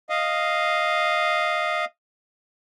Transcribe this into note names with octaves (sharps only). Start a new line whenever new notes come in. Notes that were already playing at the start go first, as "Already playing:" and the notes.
D#5 F5